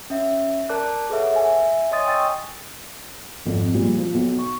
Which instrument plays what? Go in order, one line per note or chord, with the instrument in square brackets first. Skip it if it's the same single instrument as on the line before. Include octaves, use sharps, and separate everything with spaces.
[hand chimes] C#4 E5
A#4 D5 A5 D6 F#6
G#4 A4 B4 C#5 E5 F#5
E5 G#5
C#5 D#5 G#5 C6 D#6 A6
D#5 G5 C#6 E6 A6
[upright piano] G#1 F2
A#2 F3 G3 G#3
F3
B1
C#6